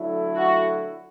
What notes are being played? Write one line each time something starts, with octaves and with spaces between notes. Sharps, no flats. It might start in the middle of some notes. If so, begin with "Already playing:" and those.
Already playing: D3 F#3 A3 E4
F#4